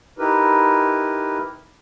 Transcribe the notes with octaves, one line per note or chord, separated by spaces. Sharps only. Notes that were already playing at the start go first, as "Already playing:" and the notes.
D#4 E4 G4 A#4 B4